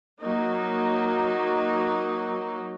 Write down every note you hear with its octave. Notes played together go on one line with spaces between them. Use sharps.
F#3 A#3 D#4